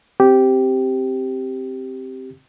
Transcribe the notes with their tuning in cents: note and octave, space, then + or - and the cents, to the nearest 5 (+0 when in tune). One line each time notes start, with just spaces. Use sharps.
C4 +0 G4 -5